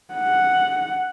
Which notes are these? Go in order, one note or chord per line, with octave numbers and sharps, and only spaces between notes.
F#5